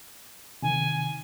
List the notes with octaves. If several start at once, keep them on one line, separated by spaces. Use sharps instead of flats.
C3 D#3 G#5